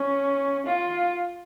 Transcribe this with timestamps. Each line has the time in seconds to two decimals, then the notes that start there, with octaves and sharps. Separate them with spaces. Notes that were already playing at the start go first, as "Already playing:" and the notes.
Already playing: C#4
0.66 F4